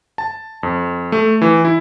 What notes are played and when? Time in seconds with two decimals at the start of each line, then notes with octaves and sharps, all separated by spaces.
0.18 A5
0.63 F2
1.12 A3
1.42 E3
1.65 E4